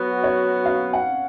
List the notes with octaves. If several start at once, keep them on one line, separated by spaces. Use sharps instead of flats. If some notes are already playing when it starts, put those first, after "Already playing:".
Already playing: F#3 B3 F#4 B4
C#5
F5
F#5